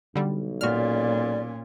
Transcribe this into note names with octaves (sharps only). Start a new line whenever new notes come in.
B1 D3 G3
A#2 C#4 F#4 D5 F6